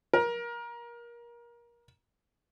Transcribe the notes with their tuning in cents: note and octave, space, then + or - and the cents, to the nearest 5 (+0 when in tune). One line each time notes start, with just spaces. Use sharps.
A#4 +25